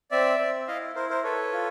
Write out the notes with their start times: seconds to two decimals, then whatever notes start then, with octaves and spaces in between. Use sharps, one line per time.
0.11 C4 D5 E5
0.39 C4
0.68 E4 D#5 F5
0.95 E4 A#4 C5
1.10 A#4 C5
1.23 A4 B4 C#5
1.52 F4